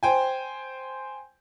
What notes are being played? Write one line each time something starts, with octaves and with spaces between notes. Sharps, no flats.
C5 G5 G#5